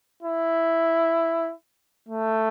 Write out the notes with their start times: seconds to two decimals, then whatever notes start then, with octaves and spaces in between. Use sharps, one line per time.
0.23 E4
2.09 A3